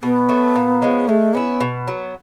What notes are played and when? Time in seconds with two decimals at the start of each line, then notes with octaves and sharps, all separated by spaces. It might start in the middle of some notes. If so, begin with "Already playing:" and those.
0.03 B2 B3
0.29 F#3 A3
0.56 A#2
0.82 F3 G#3 C#4
1.08 G#3 A3
1.34 B3 C#4 E4
1.61 B2
1.88 F#3 B3